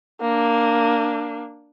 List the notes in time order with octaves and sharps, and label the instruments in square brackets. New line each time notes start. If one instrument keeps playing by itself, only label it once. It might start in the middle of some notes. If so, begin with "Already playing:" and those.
[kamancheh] A#3 D4